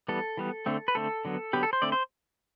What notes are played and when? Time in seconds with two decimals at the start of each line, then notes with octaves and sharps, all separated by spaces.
0.08 E3 G3 B3 A4
0.37 E3 G3 B3
0.66 D3 A3 C4
0.88 B4
0.95 D3 A3 C4 A4
1.25 D3 F#3 B3
1.53 D3 F#3 B3 G4
1.63 A4
1.73 C5
1.82 D3 A3 C4 D5
1.92 C5